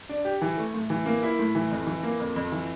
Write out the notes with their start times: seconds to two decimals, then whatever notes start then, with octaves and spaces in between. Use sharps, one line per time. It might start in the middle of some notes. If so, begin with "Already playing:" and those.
0.09 D4
0.25 G4
0.42 E3
0.57 A3
0.74 A2
0.90 E3
1.06 A#3
1.23 E4
1.39 A2
1.55 E3
1.71 F2
1.87 E3
2.03 A#3
2.20 F2
2.36 F2
2.52 E3